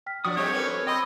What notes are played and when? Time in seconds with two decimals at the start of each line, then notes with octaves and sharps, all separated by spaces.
0.06 G5 F6 B6
0.25 F3 D4 F#4 D5 C#6 D#6 C#7
0.37 G3 C4 G4 A4 C#5
0.53 C#4 A#4 B4 D6
0.87 D#5 G5 B5 C6 E6 G6